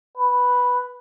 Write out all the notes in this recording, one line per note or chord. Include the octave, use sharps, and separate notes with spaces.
B4